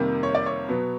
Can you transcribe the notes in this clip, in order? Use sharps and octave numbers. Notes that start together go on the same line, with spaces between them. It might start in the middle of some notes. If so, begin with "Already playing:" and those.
Already playing: F2 C3 D#3 G3 A#3
C#5
D5
C#5
B2 F#3 B3